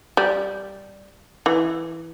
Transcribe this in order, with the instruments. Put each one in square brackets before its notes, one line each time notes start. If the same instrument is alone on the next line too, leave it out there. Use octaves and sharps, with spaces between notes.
[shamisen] G3
E3